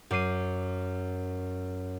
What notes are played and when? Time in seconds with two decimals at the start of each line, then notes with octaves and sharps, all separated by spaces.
0.11 F#2 D6 C7 D#7